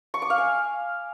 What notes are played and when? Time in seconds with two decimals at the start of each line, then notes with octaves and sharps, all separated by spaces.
0.14 C#6
0.22 D6
0.30 F5
0.38 G#5